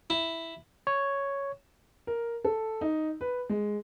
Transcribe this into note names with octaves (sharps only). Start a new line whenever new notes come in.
E4
C#5
A#4
A4
D#4
B4
G#3